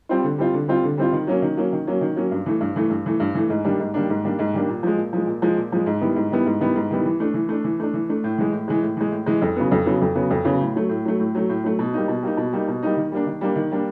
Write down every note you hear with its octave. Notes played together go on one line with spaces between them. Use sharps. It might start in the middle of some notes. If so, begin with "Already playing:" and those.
G3 C4 F4
D3
G3 C4 F4
D3
G3 C4 F4
D3
G3 C4 F4
D#3
F#3 A#3 C#4
D#3
F#3 A#3 C#4
D#3
F#3 A#3 C#4
D#3
F#3 A#3 C#4
G2
E3 A3
G2
E3 A3
G2
E3 A3
G2
E3 A3
G#2
D#3 G3 A#3 D4
G#2
D#3 G3 A#3 D4
G#2
D#3 G3 A#3 D4
G#2
D#3 G3 A#3 D4
A#2
F3 G#3
A#2
F3 G#3
A#2
F3 G#3
A#2
F3 G#3
G#2
D#3 G3 B3 E4
G#2
D#3 G3 B3 E4
G#2
D#3 G3 B3 E4
G#2
D#3 G3 B3 E4
E3
A3 D4
E3
A3 D4
E3
A3 D4
E3
A3 D4
A2
E3 G#3
A2
E3 G#3
A2
E3 G#3
A2
E3 G#3
F2
C#3 F#3 B3
F2
C#3 F#3 B3
F2
C#3 F#3 B3
F2
C#3 F#3 B3
A2
F#3 A3
A2
F#3 A3
A2
F#3 A3
A2
F#3 A3
B2
G3 A#3 D#4
B2
G3 A#3 D#4
B2
G3 A#3 D#4
B2
G3 A#3 D#4
D#3
G3 A#3 D4
D#3
G3 A#3 D4
D#3
G3 A#3 D4